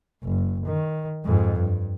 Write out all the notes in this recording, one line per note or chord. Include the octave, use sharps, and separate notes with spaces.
F#1
D#3
F2 G#2
G2